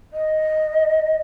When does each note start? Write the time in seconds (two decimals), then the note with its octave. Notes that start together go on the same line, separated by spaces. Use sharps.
0.13 D#5